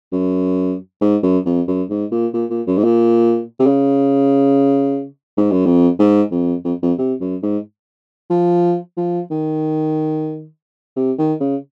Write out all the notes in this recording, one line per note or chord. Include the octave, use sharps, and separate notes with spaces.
F#2
G#2
F#2
F2
F#2
G#2
A#2
A#2
A#2
F#2
G#2
A#2
C3
C#3
G#2
F#2
F2
G#2
F2
F2
F2
C3
F#2
G#2
F3
F3
D#3
C3
D#3
C#3